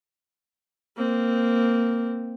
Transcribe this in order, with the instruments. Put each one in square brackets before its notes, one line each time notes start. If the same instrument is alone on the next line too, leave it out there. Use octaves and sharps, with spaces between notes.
[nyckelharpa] A#3 C4